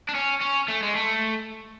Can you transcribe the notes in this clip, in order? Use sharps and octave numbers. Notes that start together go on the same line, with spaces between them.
D4
C#4
C#4
A3
G#3
A3